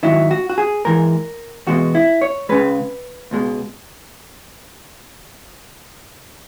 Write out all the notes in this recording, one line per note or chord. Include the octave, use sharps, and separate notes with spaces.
G#2 D#3 F#3 E4
F#4
F#4
G#4
G#2 E3 G#3 A#4
E2 B2 G#3 F#4
E4
C#5
C#2 C#3 G#3 B4
C#2 B2 G#3